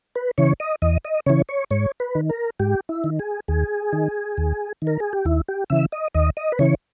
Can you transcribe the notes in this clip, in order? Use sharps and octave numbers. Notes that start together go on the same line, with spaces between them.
B4
C#3 E3 C#5
D#5
E2 D#5
D#5
C#3 E3 C#5
C#5
G#2 C#5
B4
D#3
A#4
G#2 G4
E4
D#3
G#4
D#2 G#4
D#3
D#2
D#3
A#4
G#4
G4
D#2 E4
G4
C#3 E3 E5
D#5
D#2 D#5
D#5
B4
C#3 E3 C#5